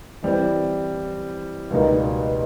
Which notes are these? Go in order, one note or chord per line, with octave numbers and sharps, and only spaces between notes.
E3 G3 C4
C#2 B2 G3 A#3 D#4